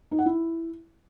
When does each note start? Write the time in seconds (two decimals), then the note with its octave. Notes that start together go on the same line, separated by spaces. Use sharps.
0.11 D#4
0.19 F#5
0.26 E4